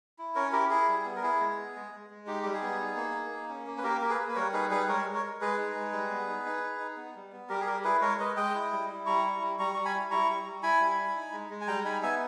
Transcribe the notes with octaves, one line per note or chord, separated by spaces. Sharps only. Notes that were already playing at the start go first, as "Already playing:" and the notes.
E4
C#4 A#4 C#5
E4 G4 A#4
E4 G#4
G3
B3
A#4
E4 G#4
G#3
B3
G#3
G#3
G#3
D#4 G4
G3 G4
G#4
B3
D#4
A#3
D#4
A#3
C#4
A#3
B4
A#3 G4 A#4
A#3 A#4
G#4 B4
A#3
B4
G3 A#4 C#5
D#4 G#4 B4
G3 G#4 B4
G#3 A#4 C#5
G#3
A#4 C#5
G#3
G#3 G#4 B4
D#4
G#3
G3
B3
D#4
D#4
D#4
D#4
B3
G3
B3
G3 G4 A#4
G#4
G3 G4 A#4
E4 G#4 B4
G#3 A#4 C#5
G#3 B4 D#5
G#3 D#5 G5
E4
G3
E4
G3 A#5 C#6
E4
G3
G3 A#5 C#6
G3 C#6
G#5 B5
E4
E4 A#5 C#6
G3
G3
E4 G#5 B5
G3
E4
D#4
G#3
G#3
G#5
G3 G5 A#5
D#4 G#5 B5
B3 E5 G#5